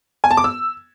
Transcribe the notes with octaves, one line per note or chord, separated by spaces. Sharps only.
G#5
A5
D6
E6